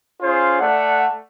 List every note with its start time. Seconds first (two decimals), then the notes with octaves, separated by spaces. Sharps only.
0.21 C#4 F4 G#4 C5
0.60 A3 D5 F#5